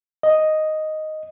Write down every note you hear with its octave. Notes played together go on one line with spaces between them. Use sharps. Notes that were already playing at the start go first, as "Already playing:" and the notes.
D#5